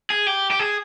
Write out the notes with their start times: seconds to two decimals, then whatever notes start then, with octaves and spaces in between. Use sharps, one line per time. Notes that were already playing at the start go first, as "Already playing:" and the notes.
0.10 G#4
0.27 G4
0.51 G4
0.59 G#4